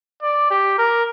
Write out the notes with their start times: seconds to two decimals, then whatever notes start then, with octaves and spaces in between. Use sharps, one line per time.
0.22 D5
0.51 G4
0.78 A#4